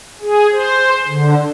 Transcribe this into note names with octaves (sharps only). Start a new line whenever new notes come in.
G#4
C5
D3